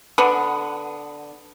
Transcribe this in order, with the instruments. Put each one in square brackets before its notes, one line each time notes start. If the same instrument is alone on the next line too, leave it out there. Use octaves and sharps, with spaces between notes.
[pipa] D3 B3